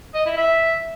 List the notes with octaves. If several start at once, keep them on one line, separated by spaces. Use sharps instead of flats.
D#5
E4
E5